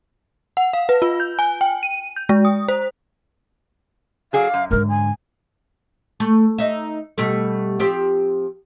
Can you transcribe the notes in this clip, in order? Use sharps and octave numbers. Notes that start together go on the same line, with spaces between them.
F#5
F5
B4
F4
G6
G#5
G5
D#7
G6
G#3
D#6
C5
F#3 G#4 D5 F5
F#2
G#2 D3 A#4
G#5
A3
D#4 E5
B2 G3 A3
F3 C4 G4